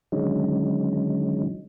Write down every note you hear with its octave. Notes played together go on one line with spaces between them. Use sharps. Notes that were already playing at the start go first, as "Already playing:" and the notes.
D3 D#3 F#3 G#3 C#4 D#4